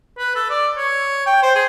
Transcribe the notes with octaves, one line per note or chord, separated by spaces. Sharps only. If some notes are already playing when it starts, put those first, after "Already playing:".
B4
A4
D5
C#5
G5
C5
G#4